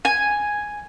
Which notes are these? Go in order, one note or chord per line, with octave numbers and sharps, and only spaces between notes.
G#5